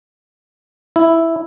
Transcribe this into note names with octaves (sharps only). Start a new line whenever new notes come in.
E4